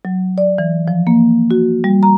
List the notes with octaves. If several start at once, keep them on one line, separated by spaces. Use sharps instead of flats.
F#3
D5
E3
F3
A#3
F#4
G3
A#5